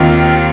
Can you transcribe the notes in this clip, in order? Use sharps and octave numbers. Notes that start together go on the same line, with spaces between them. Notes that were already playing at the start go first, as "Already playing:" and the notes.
Already playing: D#2 D#3 C4 F4